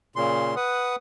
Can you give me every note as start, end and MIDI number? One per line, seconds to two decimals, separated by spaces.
0.16 0.55 46
0.16 0.55 49
0.16 0.55 84
0.56 0.96 71
0.56 0.96 78
0.56 0.96 87